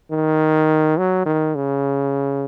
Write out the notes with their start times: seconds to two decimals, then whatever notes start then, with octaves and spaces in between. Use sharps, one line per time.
0.11 D#3
0.98 F#3
1.26 D#3
1.55 C#3